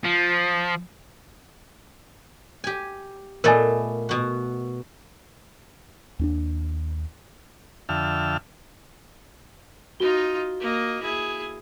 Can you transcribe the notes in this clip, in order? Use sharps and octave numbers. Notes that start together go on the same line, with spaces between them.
F3
G4 G#5
A#2 A3 B3 A#4 D#5 G#5
B2 F#4
D#2 C#4 D4
F2 D3 E5 G5 A5 F6
D#4 F4 F#4 G7
A#3 D#5
E4 G#4